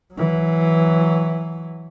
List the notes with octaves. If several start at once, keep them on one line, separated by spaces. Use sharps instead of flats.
E3 F#3